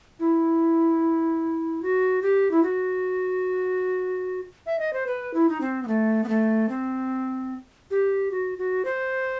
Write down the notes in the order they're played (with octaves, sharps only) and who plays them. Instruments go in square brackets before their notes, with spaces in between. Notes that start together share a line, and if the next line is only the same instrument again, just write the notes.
[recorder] E4
F#4
G4
E4
F#4
E5
D#5
C5
B4
E4
D#4
C4
B3
A3
B3
A3
C4
G4
F#4
F#4
C5